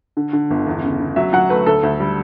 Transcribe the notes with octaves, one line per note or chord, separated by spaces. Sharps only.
D3
D3
G1
E2
C#3
C#3
F#3 E5
F#3 F#5
A3 B4
D2 A4
D2
G3